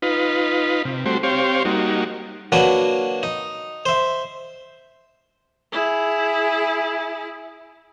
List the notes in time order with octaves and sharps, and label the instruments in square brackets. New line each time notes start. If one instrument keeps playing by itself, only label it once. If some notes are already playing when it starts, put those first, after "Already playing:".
[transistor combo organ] D#4 F4 B4
C3
G3 A3 C4 F#4 C5
C4 G4 C5 C#5 F5
G3 A#3 D#4 F#4
[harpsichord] F#3 A#3 D4 F#4 B4
D#4
C5 E5
[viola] E4 G#4